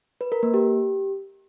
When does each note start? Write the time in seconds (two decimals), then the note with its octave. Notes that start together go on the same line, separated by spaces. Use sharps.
0.21 B4
0.32 A#4
0.43 A#3
0.54 G4